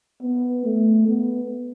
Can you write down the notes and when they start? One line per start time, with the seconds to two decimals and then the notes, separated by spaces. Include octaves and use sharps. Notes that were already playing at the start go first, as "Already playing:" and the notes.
0.22 B3
0.65 A3
1.08 B3